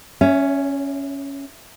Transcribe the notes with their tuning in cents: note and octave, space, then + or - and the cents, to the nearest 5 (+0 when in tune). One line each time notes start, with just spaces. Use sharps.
C#4 +0 C#5 +40 E5 +5